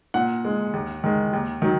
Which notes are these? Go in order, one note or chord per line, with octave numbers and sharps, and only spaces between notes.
A#2 F#5
G#3
D#2
D#3 G#3
D#2
D#3 F#3